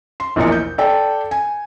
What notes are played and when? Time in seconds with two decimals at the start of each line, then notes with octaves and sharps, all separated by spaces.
0.20 C6
0.36 A#1 E2 A#2 A#4 D#5 C#7
0.52 G6
0.78 A4 D5 G5 A5
1.31 G#5